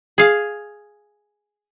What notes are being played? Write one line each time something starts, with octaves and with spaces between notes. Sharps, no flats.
G#4 F5